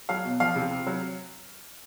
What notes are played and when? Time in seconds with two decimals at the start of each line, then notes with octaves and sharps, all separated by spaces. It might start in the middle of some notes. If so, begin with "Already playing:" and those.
0.09 F#3 F5
0.25 B2
0.40 F3 F5
0.56 C3
0.71 C3
0.87 F#3